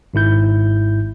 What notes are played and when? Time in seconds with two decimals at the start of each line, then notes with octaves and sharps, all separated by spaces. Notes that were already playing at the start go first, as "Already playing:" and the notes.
0.14 G#1 G#2 E4 G6